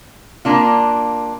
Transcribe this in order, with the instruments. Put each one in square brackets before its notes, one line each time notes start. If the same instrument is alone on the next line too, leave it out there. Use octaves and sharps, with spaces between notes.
[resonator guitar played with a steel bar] A#3 D4 F4